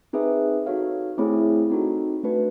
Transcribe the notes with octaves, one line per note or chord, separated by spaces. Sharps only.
C4 D#4 G#4 B4 E5
D#4 F#4 A4 C#5 F5
A3 C4 E4 G#4 C#5
C4 D#4 F#4 A4
A3 D4 F#4 B4